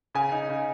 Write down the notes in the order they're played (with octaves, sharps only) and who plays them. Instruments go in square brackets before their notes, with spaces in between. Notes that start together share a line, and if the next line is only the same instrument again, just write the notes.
[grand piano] C#3 G#5
D#4
C#3